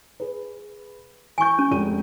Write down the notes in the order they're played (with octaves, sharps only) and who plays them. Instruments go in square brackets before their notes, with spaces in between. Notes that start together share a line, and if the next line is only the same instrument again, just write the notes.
[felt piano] G#4 B4
[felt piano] E3 G6 [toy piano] G#5 C#6
[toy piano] C#4
[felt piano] F1 G#3 D#7